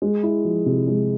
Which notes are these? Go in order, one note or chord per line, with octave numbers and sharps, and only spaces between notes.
G#3
E4
F3
C3
G#3